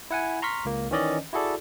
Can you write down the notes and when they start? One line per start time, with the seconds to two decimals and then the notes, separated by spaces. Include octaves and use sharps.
0.11 E4 F#5 G#5
0.42 A#5 C6 C#6 F6 B6
0.65 C#2 A#3
0.91 D#3 E3 C#4 D5 D#5
1.33 E4 F#4 G#4 A4 D5